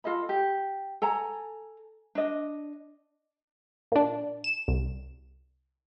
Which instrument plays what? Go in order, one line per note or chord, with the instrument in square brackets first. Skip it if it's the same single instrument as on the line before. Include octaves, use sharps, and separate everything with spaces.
[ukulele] F4 A4 D#5 B5
G4
A4 G#5 A#5
D4 D#5
[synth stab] A#2 D4
E7
C2